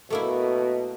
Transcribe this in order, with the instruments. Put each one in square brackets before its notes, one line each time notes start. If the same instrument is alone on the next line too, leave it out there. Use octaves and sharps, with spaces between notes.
[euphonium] B2 [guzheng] A3 A#3 E4